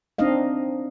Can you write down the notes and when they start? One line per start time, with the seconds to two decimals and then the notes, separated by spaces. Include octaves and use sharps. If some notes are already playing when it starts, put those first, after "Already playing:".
0.18 C4 D4 D#4 D#5 F5